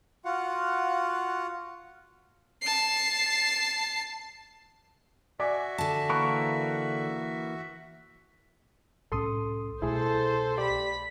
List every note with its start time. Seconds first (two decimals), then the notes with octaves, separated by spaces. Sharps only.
0.25 F4 F#4 F5 F#5
2.62 A5 C7
5.40 F#4 D5 E5 G#5 D6
5.78 D3 A5
6.10 E3 A#3 A#4 B5 C#6 F#6
9.12 C2 A2 C#4 A4 C6 D#6
9.82 C2 B2 A3 E4 G#4 A4 C5
10.58 G4 D5 B5 B6